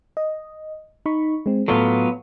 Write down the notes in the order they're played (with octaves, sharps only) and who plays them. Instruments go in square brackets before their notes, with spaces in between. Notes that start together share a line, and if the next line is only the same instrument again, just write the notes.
[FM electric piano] D#5
D#4 B5 C#6
G#3 C4
[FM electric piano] A2 A4 [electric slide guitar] F#3 B3 F4